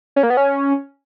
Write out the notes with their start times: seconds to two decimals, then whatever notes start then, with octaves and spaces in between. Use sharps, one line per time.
0.16 C#4
0.23 A#3
0.30 B3
0.37 C#4